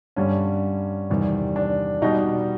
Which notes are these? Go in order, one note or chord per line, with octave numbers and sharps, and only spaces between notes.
G2 D3 G3 C#4
E2 C3 D#3 G3
D4
B2 G3 D#4